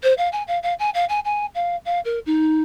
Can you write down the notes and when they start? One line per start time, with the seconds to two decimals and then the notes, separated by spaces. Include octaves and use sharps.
0.03 C5
0.18 F5
0.32 G#5
0.48 F5
0.63 F5
0.79 G#5
0.94 F5
1.09 G#5
1.25 G#5
1.55 F5
1.85 F5
2.05 A#4
2.26 D#4